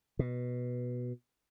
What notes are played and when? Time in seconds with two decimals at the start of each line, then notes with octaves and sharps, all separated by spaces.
0.19 B2